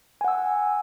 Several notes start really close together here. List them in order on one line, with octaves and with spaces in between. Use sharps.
G#5 F#5 E6